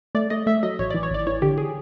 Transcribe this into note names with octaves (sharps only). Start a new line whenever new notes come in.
A3 D5
A3 D#5
A3 E5
F#3 D#5
A1 C#5
E3 D5
C#5
G#1 D5
E3 C#5
D3 G4
G#4